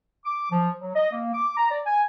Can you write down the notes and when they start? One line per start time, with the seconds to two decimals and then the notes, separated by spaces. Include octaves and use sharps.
0.25 D6
0.51 F3
0.80 F#3
0.96 D#5
1.12 A#3
1.33 D6
1.57 A#5
1.70 D5
1.86 G#5